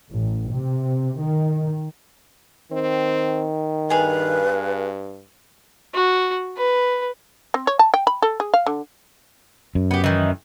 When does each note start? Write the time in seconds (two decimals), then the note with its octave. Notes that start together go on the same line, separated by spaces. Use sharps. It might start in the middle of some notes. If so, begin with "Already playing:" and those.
0.10 A1
0.53 C3
1.19 D#3
2.72 D#3 C4
3.90 G2 G#4 B4 F5
5.94 F#4
6.57 B4
7.54 C4
7.67 C#5
7.79 A5
7.94 G5
8.07 B5
8.22 A4
8.40 G#4
8.54 F5
8.66 D3
9.75 F#2
9.91 B3 G4
10.04 D#3 E3